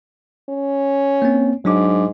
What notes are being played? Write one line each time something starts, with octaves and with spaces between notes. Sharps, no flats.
C#4
A#3 C4
G#2 F#3 D4 D6